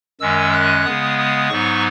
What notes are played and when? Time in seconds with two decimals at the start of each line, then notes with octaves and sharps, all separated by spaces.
0.20 F#2 D#3 G#3 C#4 E6
0.53 F#6
0.85 C#3 G#3 B3 D#6
1.18 D#6
1.49 G#2 F#3 B3 D#4 C#6